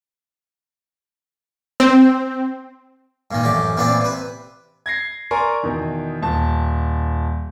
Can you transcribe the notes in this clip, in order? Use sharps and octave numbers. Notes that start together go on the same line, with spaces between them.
C4
G2 A#2 D#3
A1 F#2 G4
A#2 E3 B3 C4 D4
C3 B4
G#6 A#6 C7
A#4 D5 G#5 A#5 C6 C#6
E2 B2 D#3
D#1 A5